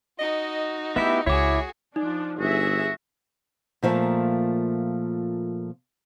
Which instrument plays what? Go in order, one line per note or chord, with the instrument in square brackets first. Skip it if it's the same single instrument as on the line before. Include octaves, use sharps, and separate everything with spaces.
[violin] D#4 F#4 [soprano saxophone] D#5
[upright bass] A3 [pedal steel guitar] B3 E4 G4 [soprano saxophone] E5
[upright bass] C#2 [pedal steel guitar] E4 D6 [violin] F#4 G#4 [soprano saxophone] C#5
[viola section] F3 D4 [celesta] D#4
[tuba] G1 [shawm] F#4 [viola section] G#4 E5
[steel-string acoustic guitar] A#2 F3 A3 A#3